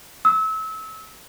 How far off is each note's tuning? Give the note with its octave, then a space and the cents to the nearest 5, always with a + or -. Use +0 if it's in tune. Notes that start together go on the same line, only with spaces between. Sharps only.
E6 -30